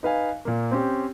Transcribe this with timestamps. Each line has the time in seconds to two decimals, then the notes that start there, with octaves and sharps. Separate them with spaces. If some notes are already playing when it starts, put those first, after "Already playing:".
0.03 D#4 B4 F5 G#5
0.45 A#2 A#3
0.71 C4 C#4 G4